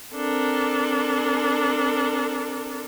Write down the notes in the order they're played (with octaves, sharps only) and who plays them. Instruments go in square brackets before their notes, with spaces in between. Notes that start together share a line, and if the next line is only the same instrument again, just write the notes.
[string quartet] C4 D4 A4 A#4